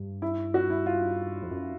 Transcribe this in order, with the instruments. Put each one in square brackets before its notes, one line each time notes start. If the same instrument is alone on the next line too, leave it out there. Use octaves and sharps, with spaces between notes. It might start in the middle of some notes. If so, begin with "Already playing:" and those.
Already playing: [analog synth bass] G2
[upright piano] E4
F#4
E4
F4
[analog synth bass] F2
F#2